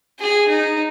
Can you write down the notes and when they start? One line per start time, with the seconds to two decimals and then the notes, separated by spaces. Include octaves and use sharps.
0.19 G#4
0.48 D#4